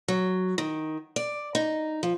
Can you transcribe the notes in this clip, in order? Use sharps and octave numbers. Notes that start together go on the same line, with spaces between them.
F#3
D#3
D5
D#4
F3